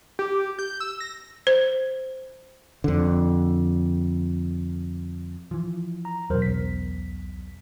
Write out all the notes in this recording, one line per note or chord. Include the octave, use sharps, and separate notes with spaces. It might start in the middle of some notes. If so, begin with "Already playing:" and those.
G4
G6
E6
A#6
C5
F2 D3
E3 F3
A#5
E2 B2 F#3 A#4 C5
B1 B6